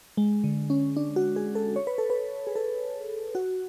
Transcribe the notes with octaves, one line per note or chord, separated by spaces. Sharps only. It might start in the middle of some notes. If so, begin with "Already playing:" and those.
G#3
D3
C#4
D4
F#4
G#4
A4
C#5
B4
A4
B4
G#4
A4
F#4